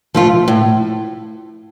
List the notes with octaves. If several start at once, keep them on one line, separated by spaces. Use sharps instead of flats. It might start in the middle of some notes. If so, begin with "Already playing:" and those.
F3 A3 F4
A2